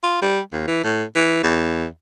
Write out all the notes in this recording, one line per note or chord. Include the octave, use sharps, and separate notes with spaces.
F4
G3
D#2
E3
A2
E3
E2